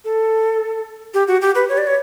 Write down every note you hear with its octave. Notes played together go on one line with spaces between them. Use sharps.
A4
G4
F#4
G4
B4
C#5
D5
C#5